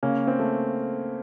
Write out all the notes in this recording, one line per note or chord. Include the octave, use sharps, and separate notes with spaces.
C#3 A#3 C#4
C4
A3